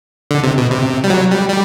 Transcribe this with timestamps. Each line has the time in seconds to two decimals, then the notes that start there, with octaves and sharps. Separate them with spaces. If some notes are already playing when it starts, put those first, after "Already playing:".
0.31 D3
0.43 C3
0.58 B2
0.71 C3
1.04 G3
1.10 F#3
1.31 G3
1.49 G3